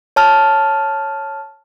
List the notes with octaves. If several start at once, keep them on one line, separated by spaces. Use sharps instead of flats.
C#5 A5 F6